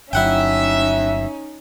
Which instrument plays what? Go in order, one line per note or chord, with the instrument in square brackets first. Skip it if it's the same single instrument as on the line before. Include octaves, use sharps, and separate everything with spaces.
[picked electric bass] G1 F#3 [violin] C#4 D#4 [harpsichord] E4 F#5 G5 [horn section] E5